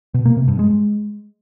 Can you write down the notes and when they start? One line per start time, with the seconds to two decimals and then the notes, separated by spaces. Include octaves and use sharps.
0.14 B2
0.25 A#3
0.37 C3
0.48 G2
0.59 G#3